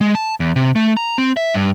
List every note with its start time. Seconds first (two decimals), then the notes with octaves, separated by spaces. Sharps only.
0.01 G#3
0.15 A5
0.40 E2
0.56 C3
0.76 A3
0.97 A#5
1.18 C4
1.37 E5
1.54 G2